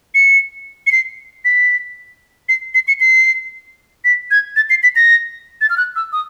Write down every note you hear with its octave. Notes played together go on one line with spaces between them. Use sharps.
C#7
C#7
C7
B6
C7
C7
C#7
C7
B6
G#6
A6
C7
B6
A#6
A6
F6
F#6
E6
D#6